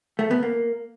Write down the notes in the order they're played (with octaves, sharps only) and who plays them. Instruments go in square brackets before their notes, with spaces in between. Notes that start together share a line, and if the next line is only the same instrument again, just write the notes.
[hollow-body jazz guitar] A3
B3
A#3